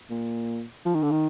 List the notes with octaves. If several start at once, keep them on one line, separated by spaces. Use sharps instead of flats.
A#2
F3
D#3
D3
D#3